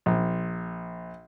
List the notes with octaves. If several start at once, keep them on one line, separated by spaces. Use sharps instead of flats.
A#1